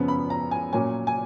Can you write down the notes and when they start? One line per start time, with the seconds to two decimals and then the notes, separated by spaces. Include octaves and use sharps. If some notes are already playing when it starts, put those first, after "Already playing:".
Already playing: F#2 C#3 F3 B3
0.08 B5
0.30 A#5
0.51 G#5
0.73 A#2 F#3 A#3 C#4 G#5
1.07 G#5